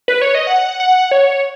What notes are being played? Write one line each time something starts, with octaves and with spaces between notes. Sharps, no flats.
B4
C#5
D#5
F#5
F#5
C#5